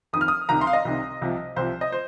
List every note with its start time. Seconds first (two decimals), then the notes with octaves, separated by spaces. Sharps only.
0.13 F2 D#3 D#6
0.21 F6
0.28 D#6
0.49 C2 C3 D#3 A#5
0.61 C6
0.67 F5
0.73 D#5
0.85 C2 C3 D#3
1.21 C2 C3 F3
1.56 C2 C3 F3 C5
1.81 D#5
1.92 C5